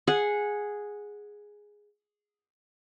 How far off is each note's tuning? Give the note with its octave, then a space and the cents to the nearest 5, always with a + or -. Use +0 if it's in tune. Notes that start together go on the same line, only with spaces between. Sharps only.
G#4 +0 F#5 -15